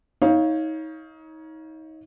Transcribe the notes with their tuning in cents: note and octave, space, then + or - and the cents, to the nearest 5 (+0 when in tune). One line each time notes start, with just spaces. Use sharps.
D#4 +30 C#5 +0 F5 +0